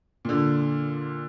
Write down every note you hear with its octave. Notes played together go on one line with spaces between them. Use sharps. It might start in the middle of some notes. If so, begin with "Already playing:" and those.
A#2 D3